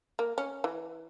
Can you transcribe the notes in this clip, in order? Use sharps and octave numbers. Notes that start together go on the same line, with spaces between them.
A#3
C#4
E3